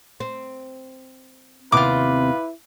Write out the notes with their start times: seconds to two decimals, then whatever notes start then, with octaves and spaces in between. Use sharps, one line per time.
0.20 C4
1.72 D#2 C3 B3 E4 F4 B4 D6